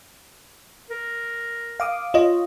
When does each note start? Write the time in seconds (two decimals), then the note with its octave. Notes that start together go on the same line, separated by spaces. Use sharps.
0.90 A#4
1.80 F5 D6 D#6
2.14 F4 C#5 D#5